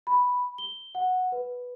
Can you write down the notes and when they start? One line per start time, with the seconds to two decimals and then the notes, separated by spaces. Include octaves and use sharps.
0.07 B5
0.58 G7
0.95 F#5
1.32 B4